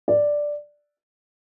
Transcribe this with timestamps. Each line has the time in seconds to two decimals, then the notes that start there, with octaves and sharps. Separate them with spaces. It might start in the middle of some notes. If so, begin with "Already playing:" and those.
0.08 D5